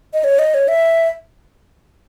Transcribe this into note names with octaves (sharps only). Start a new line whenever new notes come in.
D#5
C#5
D#5
C#5
E5